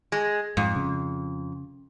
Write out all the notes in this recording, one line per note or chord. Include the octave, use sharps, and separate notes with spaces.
G#3
F2 G#2
C#3